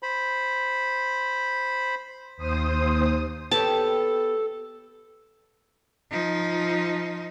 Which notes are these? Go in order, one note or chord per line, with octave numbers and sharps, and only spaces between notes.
C5 B5
D#2 C5 D#6
B3 G4 A4 C#5 A5
F3 D#4